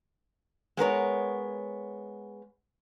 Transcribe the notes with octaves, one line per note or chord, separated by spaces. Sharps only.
G#3 B3 A#4 C#5